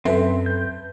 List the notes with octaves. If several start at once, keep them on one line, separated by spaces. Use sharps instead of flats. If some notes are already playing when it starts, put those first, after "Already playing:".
F#2 C4 A4 B4 E5
G6